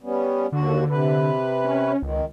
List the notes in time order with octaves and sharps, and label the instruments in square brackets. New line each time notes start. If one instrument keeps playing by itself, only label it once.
[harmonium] G3 B3 C#4
[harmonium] D#2 F#4 [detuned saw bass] D3
[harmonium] C3 B4
[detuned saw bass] C#4
[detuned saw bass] C#2 [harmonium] D#3